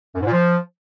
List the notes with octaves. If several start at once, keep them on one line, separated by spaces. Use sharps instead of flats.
F#2
G#2
A#2
F3